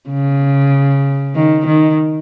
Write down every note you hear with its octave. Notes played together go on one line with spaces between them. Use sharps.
C#3
D#3
D#3